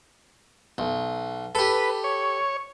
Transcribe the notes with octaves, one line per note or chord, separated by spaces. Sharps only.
B1
G4 A4 B4
C#5